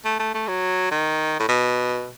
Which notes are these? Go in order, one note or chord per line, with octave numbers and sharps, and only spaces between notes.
A3
A3
A3
F#3
D#3
A2
B2